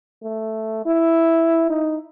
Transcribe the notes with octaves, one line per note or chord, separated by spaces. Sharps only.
A3
E4
D#4